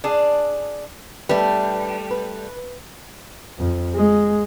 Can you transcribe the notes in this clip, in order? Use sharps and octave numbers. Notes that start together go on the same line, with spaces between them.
D4 G#4
G3 A3 D4 B4
B4
F2
G#3